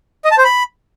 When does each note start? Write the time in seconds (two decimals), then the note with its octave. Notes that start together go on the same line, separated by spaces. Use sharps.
0.25 D#5
0.31 A5
0.38 C5
0.44 B5